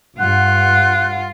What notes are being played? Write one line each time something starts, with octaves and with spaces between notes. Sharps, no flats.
G2 F4 F#5 F#6